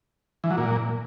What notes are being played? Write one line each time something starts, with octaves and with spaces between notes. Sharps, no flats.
E3
F#3
A#2